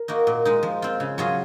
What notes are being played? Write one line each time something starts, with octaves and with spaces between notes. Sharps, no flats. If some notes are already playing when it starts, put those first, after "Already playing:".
Already playing: A#4
A#3 D#4 F#4
A#2
G#3 D#4
F3
C4 F4
C#3
F#3 C#4 F4 G#4